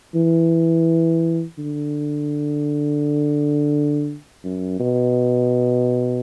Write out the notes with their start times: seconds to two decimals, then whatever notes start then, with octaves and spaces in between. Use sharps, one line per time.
0.15 E3
1.58 D3
4.44 F#2
4.79 B2